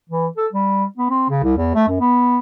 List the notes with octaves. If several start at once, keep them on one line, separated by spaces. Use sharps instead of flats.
E3
A4
G3
B3
C4
C#3
C2
E2
A3
F#2
B3